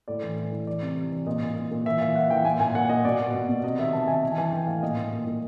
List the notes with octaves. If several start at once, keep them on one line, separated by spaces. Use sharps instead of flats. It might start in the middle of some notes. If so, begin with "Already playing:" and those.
A2 D5
E3
E3
E3
E3 D5
C3
E3
E3
A#2 D#5
A#2
A#2
A#2
E3 E5
E3 F5
E3 F#5
E3 G5
A#2 G#5
A#2 G#5
A#2 F#5
A#2 D#5
B2 D5
B2
B2
B2
C3 D#5
D#3 E5
D#3 A5
C3 G#5
E3 A5
E3 G#5
E3 G5
A2 F5
A#2 D#5
A#2
A#2
A#2